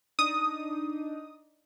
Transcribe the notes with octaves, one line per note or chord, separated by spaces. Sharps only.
D4 D#4 D#6